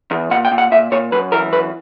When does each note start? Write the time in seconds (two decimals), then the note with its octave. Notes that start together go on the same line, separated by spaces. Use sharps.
0.11 E2
0.31 A#2 F#5
0.45 G5
0.51 A#2
0.58 F#5
0.71 A#2 E5
0.92 A#2 C#5
1.12 F#2 B4
1.32 E3 A#4
1.52 F#2 B4